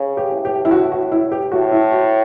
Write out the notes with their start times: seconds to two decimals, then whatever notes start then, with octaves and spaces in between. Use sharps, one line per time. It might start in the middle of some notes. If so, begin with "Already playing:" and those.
Already playing: C#3
0.17 G4
0.31 A2
0.45 G4
0.65 E4
0.71 F#4
0.92 F#4
1.12 E4
1.32 G4
1.52 A2 F#4
1.72 E4
1.92 F#4